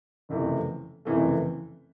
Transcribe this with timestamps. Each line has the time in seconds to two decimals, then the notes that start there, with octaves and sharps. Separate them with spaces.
0.29 F#1 F2 C3 E3 A3
1.05 F#1 F2 C3 E3 A3